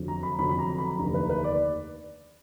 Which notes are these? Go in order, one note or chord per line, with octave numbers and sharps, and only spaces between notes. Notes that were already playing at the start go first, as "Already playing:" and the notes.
Already playing: F1 F2 D3 F#3
A#5
B5
F1 F2 D3 F#3 B5
B5
A#5
B5
F1 D#2 D3 A#5
B4
B4
D5